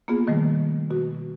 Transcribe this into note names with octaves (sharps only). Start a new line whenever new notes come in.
A#3 B3 F4 G#4
B2 D#3 F3 G3 A3
B2 F#4